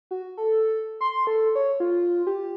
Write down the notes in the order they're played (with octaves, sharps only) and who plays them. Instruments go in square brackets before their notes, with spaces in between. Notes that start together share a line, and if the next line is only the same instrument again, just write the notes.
[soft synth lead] F#4
A4
C6
A4
C#5
F4
G4